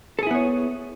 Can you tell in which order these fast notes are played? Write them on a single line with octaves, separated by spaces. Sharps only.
A4 G#4 E4 B3 C#5